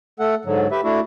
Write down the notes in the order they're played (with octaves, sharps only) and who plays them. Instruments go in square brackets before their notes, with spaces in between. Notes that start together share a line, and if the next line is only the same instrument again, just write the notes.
[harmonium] A3 A4 F#5
G#2 D3 F#3
G4 B4 E5
A3 D4 E4 F#4